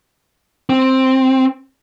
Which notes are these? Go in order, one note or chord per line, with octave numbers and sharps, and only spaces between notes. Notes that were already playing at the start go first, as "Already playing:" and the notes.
C4